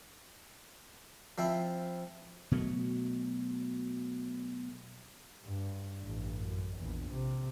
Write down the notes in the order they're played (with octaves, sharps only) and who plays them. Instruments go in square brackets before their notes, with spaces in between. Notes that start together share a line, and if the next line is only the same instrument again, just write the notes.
[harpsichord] F3 C4 E4
[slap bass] B2 F#3 A3
[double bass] G2
A1 G2
F#2
A#1 E2
C3